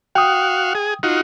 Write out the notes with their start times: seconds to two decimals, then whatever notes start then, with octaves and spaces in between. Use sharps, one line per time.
0.15 F#4 F5 G5 D#6
0.75 G#4
1.03 D#4 F4 F#4